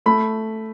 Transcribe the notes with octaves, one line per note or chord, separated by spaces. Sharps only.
A3 B5